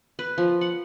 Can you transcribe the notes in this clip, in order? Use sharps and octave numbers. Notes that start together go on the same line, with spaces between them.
B4
F3
F#5